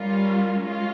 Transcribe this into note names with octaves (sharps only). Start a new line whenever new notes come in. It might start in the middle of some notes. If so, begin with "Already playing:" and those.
Already playing: G3 C#4 F4 A#4
G#3 C#4 F4